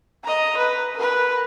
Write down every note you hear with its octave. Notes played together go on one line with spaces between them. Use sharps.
D#5 A#5
B4
A#4 B4